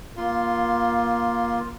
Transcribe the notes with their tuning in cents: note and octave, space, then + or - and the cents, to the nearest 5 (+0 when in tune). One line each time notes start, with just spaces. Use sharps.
A#3 +20 F4 +0 C6 +0